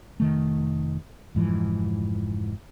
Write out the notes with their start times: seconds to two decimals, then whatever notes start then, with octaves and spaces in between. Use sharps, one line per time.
0.20 F1 D#3 A3
1.35 F1 G#2 E3 F3